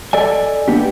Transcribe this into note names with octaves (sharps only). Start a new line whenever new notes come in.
A4 D5 D#5 G#5
A#3 B3 D4 D#4 G4